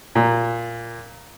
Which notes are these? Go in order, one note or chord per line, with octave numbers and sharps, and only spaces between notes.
A#2